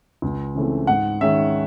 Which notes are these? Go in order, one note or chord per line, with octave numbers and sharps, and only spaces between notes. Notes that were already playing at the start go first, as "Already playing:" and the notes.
C#2
C#3 E3 A3 C4
G#2 F#5
D#3 G#3 C#4 E5